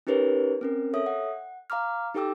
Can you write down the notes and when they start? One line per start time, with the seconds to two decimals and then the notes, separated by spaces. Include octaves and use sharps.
0.07 C#4 D#4 G4 A#4 B4 C#5
0.61 C4 C#4 A#4
0.94 A4 C#5 E5 D#6
1.06 F#5
1.70 F5 A#5 D6 F6
2.14 D#4 G4 A4 G5 D6 E6